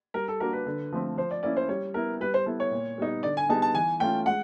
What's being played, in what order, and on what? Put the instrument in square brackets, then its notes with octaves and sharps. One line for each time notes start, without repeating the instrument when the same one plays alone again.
[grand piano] G3 [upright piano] A#4
[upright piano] A4
[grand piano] A#3 D4 F#4 [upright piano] A#4
[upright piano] B4
[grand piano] D3
F3 A3 C4
[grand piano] F3 [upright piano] C5
[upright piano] D5
[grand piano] A#3 C#4 E4 [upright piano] D5
[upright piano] C5
[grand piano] G3 [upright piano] C#5
[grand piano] B3 E4 [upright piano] A#4
[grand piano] G3 [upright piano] B4
[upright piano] C5
[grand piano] B3 E4 A4
[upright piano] C#5
[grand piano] A#2
G3 B3 D#4
[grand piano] D3 [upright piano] D5
[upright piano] G#5
[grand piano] G3 B3 D#4 G#4 [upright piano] A5
[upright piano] A5
[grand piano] E3 [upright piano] G#5
[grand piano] A3 C#4 F4 [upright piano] G5
[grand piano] G#3 [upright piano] F#5